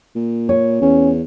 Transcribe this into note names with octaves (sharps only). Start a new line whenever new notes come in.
A#2
C#5
E2 C#4